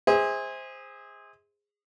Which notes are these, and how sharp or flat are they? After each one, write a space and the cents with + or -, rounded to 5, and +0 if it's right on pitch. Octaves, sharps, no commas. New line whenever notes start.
G#4 -20 C5 +0 E5 -45